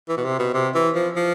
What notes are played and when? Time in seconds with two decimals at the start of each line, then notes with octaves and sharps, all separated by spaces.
0.09 E3
0.17 B2
0.24 C3
0.39 B2
0.54 C3
0.75 E3
0.95 F3
1.16 F3